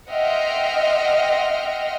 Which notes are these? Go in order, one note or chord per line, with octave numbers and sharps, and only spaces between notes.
D#5 E5 F#5 G5 C6 F6